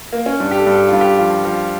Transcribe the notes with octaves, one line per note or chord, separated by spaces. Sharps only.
A#3
C#4
G2 D4
G4
A4
G2
G4
G2 F4
G4
F3
F3